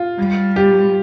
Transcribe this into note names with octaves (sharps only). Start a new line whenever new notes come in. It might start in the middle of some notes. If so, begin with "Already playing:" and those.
Already playing: F4
G3
G4